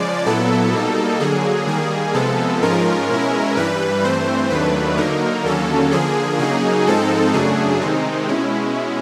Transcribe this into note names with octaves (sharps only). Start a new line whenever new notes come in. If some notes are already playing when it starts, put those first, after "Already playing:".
Already playing: C#3 F3 G#3 D5
A#2 F#3 B3 E4 A4
B2 G3 A#3 D#4
D3 F#3 A#3 G#4
D#3 G3 A#3 G#4
C3 F3 G#3 B3 A4
G#2 F3 G#3 C#4 F4 A#4
B2 G#3 C#4 E4
G2 E3 G3 B4
G2 E3 A3 C4 C5
D#2 D#3 F#3 A3 D4 B4
D3 F#3 A#3 D#4 A#4
D#2 D3 F#3 A#3 C#4 A4
D3 F3 A#3 G#4
C#3 F#3 A#3 D#4 G#4
G#2 F3 G#3 C4 D#4 A4
F#2 C#3 F#3 A3 D4 G#4
C3 D#3 G#3 C4 D#4
B2 G#3 C#4 E4